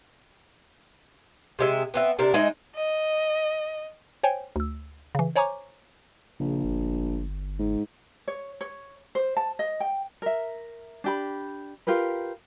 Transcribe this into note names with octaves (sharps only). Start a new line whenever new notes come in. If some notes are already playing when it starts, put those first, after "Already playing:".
C3 G#3 E5
B3 C4 E5
C3 D4 A#4
G#3 D#4 D#5 E5
D#5
C5 C#5 G5 G#5
D2 E6
C#3 E3
C5 C#5 G#5 A#5 C#6 D6
A#1 C#3
G1
G#2
C#5
C#5
C5
A5
D#5
G5
A#4 E5
D4 G4 B5
F4 G4 A#4 B4